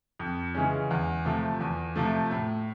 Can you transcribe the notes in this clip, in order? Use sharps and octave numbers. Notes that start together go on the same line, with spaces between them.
F2
C#3 E3 G#3 C#4
E2
C3 F3 A3
E2
C3 F3 A3
A2